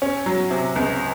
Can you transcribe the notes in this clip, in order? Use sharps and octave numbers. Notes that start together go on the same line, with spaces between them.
C#4
F#3
C3
C#2